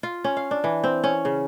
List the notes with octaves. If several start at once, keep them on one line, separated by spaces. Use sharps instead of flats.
F4
C#4
F5
D4
E3
C4
C#4
C#3